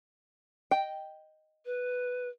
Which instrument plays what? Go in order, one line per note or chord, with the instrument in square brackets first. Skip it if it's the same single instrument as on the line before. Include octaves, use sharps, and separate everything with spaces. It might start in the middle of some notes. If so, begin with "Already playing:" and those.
[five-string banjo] D#5 G5
[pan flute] B4